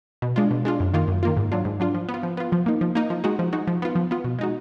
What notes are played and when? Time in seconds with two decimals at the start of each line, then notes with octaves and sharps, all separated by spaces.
0.22 B2
0.36 G#3 D4 F4
0.51 B2
0.65 G#3 D4 F4
0.80 F#2
0.94 D#3 A#3 F4
1.08 F#2
1.23 D#3 A#3 F4
1.37 G#2
1.52 F#3 D4 F4
1.65 G#2
1.80 F#3 D4 F4
1.95 F3
2.09 B3
2.14 F4
2.23 F3
2.37 B3 F4
2.52 F3
2.66 A#3 D#4
2.81 F3
2.95 A#3 D#4
3.10 F3
3.24 G#3 D#4 F#4
3.39 F3
3.53 G#3 D#4 F#4
3.67 F3
3.82 B3 F4
3.95 F3
4.11 B3 F4
4.24 B2
4.39 G#3 D#4 F#4